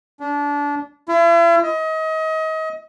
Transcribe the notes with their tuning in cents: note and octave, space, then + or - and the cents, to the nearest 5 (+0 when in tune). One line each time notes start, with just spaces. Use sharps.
D4 -25
E4 +45
D#5 +30